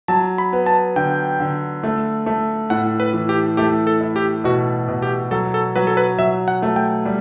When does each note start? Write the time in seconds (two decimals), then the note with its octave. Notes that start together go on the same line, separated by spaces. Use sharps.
0.08 F#3 A5
0.38 B5
0.53 B3
0.66 A5
0.96 D3 G5
1.40 D3
1.83 A3
2.26 A3
2.70 A2 F#5
3.00 B4
3.13 E3
3.29 G4
3.57 A3 G4
3.87 A4
4.01 E4
4.16 G4
4.44 B2 F#4
4.88 B2
5.02 G4
5.31 F#3 A4
5.54 A4
5.76 F#3 B4
5.87 A4
5.97 B4
6.18 F#3 E5
6.48 F#5
6.62 A3
6.76 G5
7.05 G3